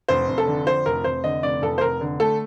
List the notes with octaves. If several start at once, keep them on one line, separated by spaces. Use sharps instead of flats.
F1 C5
F1
A4
D3
F2 C5
F1 A#4
F1 C5
D3 D#5
F1 D5
F1 A4
C5
F1 A#4
D3
A3 A4